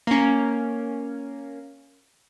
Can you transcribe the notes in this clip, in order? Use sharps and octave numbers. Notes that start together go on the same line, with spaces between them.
A#3 C#4